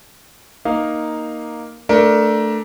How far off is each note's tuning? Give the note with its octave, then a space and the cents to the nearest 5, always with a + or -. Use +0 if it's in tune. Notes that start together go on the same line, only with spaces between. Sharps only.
A#3 +5 D#4 +0 F5 +0
A3 +5 D4 +0 A#4 +25